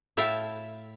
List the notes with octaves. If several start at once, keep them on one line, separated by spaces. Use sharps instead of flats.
A2 E4 E5 F5 G5 A5